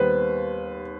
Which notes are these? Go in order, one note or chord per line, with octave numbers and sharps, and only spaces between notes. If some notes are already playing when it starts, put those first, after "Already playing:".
Already playing: D#2 D#3 G3 B3 B4 C5